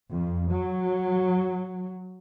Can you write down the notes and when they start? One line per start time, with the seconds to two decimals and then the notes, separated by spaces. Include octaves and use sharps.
0.11 F2
0.54 F#3